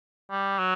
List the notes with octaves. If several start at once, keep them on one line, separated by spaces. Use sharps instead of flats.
G3
F#3